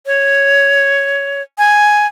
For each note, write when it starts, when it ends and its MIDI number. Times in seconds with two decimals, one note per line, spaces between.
0.06 1.42 73
1.58 2.07 80